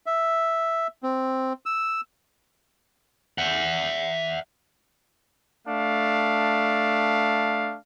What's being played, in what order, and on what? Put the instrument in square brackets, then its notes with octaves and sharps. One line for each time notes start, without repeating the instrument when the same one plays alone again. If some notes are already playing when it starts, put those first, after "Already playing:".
[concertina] E5
C4
E6
[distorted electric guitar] E5 F#5
[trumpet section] A3 D4 F5